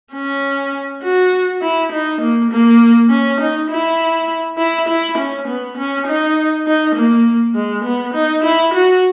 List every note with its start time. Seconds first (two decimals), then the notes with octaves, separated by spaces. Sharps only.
0.14 C#4
1.03 F#4
1.62 E4
1.92 D#4
2.21 A#3
2.51 A#3
3.10 C#4
3.41 D#4
3.70 E4
4.58 E4
4.89 E4
5.18 C#4
5.48 B3
5.77 C#4
6.07 D#4
6.67 D#4
6.95 A#3
7.55 G#3
7.85 B3
8.14 D#4
8.44 E4
8.74 F#4